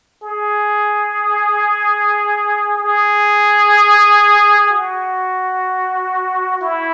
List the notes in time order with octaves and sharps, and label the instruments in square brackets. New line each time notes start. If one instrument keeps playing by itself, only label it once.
[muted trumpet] G#4
G#4
F#4
E4